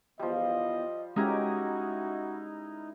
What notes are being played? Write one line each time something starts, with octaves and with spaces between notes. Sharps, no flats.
E2 F3 G3 D#5
G#3 C#4 D#4 E4 F#4 G4 A#4 D#5